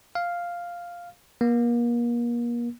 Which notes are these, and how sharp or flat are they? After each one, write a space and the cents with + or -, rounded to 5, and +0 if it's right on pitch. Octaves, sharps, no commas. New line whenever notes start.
F5 +0
A#3 +35